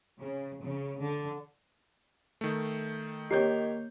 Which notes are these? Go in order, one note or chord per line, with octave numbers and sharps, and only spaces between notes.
C#3
C#3
D3
D#3 A3
D#3 A#3 G4 C#5 G6 C7